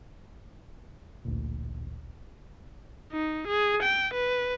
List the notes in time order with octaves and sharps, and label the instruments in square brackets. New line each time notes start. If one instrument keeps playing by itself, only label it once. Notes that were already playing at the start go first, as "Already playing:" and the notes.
[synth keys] A1 D2 A#2
[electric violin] D#4
G#4
G5
B4